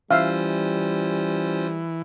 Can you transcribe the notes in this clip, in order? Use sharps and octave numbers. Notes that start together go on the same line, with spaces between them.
E3 G3 C#4 F4 C5 E5 F5